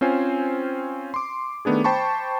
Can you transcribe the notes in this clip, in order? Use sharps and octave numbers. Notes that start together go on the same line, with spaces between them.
C4 C#4 F4 C5 G#5
C6 D6
D#3 A3 B3 D4 G#4
C5 G5 A5 B5 C#6